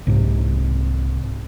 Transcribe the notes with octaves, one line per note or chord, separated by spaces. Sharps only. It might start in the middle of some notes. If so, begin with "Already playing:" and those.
C2 G#2 C3